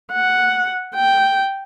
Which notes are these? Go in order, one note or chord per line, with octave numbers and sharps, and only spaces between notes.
F#5
G5